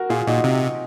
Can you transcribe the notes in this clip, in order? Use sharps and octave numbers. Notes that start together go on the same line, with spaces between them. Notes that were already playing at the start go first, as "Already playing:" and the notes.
Already playing: F#4 A#4
A#2 F4 G#4
A#2 D#4 F#4
C3